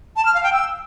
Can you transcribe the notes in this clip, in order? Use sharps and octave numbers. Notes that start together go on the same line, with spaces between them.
A5
F6
F5
G5
E6